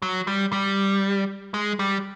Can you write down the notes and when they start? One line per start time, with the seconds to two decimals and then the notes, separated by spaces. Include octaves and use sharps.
0.02 F#3
0.27 G3
0.52 G3
1.54 G#3
1.79 G3